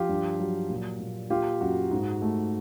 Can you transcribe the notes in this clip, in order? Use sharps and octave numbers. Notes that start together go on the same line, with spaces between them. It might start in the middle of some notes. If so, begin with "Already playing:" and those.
Already playing: F3 F4 G4
G2
F#3
A#2
A#2
A#3 F4 G4
F#2 F#4
G#2
A3